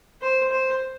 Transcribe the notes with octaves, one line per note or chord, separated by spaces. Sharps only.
C5
C5